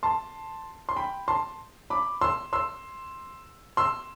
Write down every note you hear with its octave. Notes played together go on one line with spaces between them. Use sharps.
A5 C6
C6
G5 B5
A5 C6
B5 D6
C6 E6
C6 E6
C6 E6